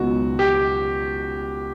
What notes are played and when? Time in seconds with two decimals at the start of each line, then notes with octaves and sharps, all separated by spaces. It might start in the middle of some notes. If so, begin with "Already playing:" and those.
Already playing: C#2 B2 F#3 B3 D#4 F#4
0.39 G4